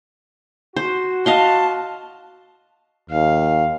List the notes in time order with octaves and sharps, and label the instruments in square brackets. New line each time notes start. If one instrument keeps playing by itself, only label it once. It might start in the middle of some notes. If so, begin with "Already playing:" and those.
[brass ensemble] F#4 [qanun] C5
[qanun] D#5 F5 C6 [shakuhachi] A5
[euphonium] D#2 [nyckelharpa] F5